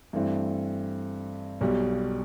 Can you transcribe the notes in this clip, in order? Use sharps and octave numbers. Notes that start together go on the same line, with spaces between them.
G2 E3 A3 C4
B1 B2 G3